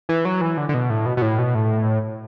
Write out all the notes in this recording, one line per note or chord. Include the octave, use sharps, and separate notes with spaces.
E3
F#3
E3
D3
D3
B2
A2
B2
B2
A2
B2
A2